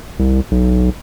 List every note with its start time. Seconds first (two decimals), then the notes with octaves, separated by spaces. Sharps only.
0.19 C2
0.51 B1